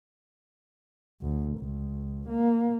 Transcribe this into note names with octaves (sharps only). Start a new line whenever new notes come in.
D2
C#2
A#3